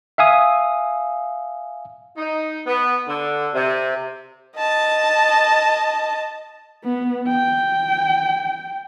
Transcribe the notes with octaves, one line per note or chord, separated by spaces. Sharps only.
E5 F5 G#5 D#6
D#4
B3
D3
C3
D#5 A5
B3
G5